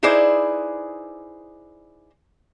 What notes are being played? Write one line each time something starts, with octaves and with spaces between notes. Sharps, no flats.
D#4 E4 G#4 B4 C5 D5